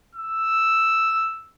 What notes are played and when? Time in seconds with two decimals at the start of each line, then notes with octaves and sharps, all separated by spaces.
0.15 E6